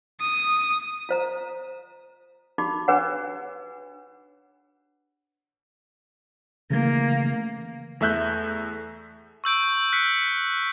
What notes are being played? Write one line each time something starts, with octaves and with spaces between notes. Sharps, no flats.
D#6
F4 C5 A#5
D#4 F#4 G4 B5 D6
D4 G#4 B4 C#5 F#5
C#3 E3 A3 A#3
E2 A3 E5 F#6 G6
C#6 E6 G6 D7
F6 F#6 B6 C#7